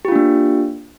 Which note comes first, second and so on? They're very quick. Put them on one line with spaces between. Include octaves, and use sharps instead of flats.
G4 F4 D4 A#3